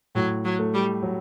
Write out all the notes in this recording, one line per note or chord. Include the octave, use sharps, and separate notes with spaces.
A2 F#3
F#3
A3
G3
F#3